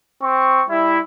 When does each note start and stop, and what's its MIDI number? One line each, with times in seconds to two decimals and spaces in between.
0.21 0.62 60
0.21 0.62 85
0.69 0.98 55
0.69 0.98 64